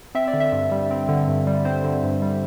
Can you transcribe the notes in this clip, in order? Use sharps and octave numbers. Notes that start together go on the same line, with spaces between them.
C4 E5
D5
D3
E5
G2
G3
C4
D3
G2
G3
C4 C5
D3
G2
G3